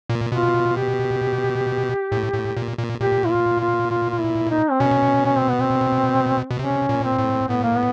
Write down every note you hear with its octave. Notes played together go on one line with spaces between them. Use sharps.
A#2
B2 F4
G4
A2
A2
A#2
A#2
A#2 G4
E4
F4
F4
F4
F4
E4
D#4
C4
B2 C#4
C#4
C4
B3
C4
B2
C3 C#4
A#2
C4
A2
A2 B3
A#3
B3